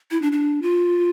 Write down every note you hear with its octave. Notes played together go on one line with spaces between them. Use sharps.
E4
D4
D4
F4